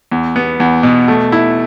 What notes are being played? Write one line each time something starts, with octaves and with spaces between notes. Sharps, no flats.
E2
B3
E2
B2
A3
E4